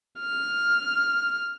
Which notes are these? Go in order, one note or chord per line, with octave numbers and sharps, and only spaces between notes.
F6